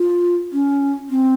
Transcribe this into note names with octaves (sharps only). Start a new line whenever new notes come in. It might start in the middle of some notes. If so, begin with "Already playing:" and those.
Already playing: F4
C#4
C4